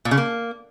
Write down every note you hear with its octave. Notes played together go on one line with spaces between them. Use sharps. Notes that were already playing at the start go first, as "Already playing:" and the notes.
A#2
C#3
A#3